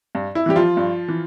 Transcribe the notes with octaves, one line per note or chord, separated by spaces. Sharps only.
G2
E4
E3 G3 G4
F3 F4
G2
E3